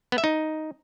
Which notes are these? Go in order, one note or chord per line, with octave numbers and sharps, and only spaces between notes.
B3
E5
D#4